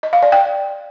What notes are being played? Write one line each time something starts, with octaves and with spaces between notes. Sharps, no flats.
D#5
F5
D5
G5